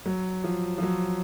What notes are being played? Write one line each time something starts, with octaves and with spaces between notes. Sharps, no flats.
F#3
F3
F3
F#3